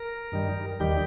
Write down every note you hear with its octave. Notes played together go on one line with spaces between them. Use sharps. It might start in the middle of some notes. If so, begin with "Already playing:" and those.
Already playing: A#4
G2 D#3 G3
D#2 D#3 G3 G4